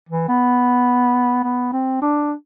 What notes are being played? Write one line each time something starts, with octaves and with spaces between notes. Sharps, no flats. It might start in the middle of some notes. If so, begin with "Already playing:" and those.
E3
B3
B3
C4
D4